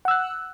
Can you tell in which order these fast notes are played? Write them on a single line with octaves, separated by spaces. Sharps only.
F#5 E6 F#6